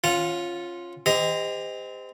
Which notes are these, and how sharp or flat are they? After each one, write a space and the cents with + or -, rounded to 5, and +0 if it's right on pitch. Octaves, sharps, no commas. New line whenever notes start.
C#4 -20 F4 +0 F#5 -25
C4 -30 G4 +40 D#5 +0